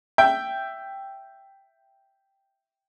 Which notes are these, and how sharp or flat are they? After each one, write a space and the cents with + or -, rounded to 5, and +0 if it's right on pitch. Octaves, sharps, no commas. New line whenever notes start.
E5 +10 G5 +0